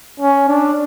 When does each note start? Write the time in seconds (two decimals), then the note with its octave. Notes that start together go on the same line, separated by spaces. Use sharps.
0.20 C#4
0.49 D4